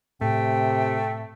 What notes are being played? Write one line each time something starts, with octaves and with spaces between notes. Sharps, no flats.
A2 C3 A3 G5